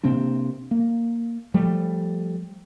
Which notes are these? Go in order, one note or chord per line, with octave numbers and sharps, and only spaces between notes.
C3 A#3 C4 D4
A#3
F3 G3 A3